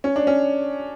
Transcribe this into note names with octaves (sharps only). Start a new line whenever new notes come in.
C#4
D4
C#4